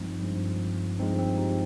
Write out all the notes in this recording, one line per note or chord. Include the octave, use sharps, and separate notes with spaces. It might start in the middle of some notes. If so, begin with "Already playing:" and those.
Already playing: G2 F3 G#3 C4 D#4
G2 F3 G#3
G2 F3 G#3 C4 D#4
C4 D#4
D#4 G4